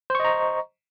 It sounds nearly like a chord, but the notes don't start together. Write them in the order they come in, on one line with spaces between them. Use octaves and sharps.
C5 C#6 D#5 A#5